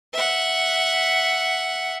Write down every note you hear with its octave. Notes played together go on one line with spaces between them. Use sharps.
E5 F#5